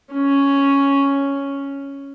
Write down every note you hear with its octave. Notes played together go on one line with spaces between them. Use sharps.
C#4